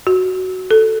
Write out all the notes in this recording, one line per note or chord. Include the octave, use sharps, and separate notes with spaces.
F#4
A4